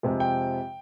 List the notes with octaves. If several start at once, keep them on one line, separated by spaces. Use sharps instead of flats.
F2 C3 F3 G#3 C4
G5